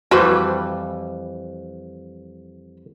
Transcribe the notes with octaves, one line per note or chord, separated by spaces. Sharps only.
F2 E3 G3 F#4 B4 C5